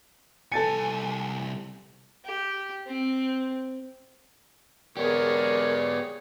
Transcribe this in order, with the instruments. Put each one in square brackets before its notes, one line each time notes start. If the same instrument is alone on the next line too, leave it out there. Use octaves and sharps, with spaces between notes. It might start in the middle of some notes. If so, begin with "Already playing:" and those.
[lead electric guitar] C2 G#5 [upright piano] A4 A6 C#7
[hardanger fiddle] G4
C4
[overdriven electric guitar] B3 G4 [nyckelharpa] G#4 C#5 [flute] A#4 [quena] D5